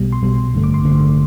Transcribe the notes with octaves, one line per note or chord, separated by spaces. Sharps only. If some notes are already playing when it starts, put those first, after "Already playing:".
Already playing: B1 B2 G3
C6
B1 B2 G3
A1 G2 D3 A3
D6
C6
A1 G2 D3 A3